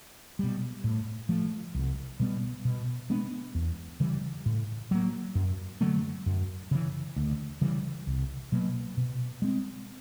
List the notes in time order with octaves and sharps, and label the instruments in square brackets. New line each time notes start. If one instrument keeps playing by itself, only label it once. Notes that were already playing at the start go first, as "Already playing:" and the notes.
[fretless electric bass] B2 G3
A2
F3 A3
C2
B2 G3 B3
B2
G#3 B3 D4
E2
C#3 E3 G3
A2
F#3 A#3
F#2
D3 F#3 A3
F#2
C#3 E3
D2
C#3 E3 G3
C2
B2 F#3 A#3
B2
G#3 C4